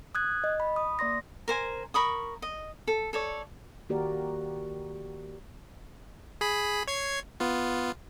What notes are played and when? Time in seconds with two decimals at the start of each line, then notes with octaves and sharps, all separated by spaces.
0.15 D#6 F#6 G#6
0.44 D#5
0.60 B5
0.76 D#6
0.99 A#3 D5 C6 A#6
1.48 A#4 C5 G#5
1.94 A#4 B5 C#6 D#6
2.42 D#5
2.87 A4
3.13 A4 C#5 D5
3.89 D#3 A#3 F#4 G4 A#4 D5
6.41 G#4 B5
6.88 C#5 G#6 C7
7.40 B3 F4